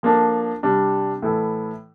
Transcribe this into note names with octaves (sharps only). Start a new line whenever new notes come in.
F3 A#3 D4 A4
C3 G3 D4
A2 E3 A3 E4 A4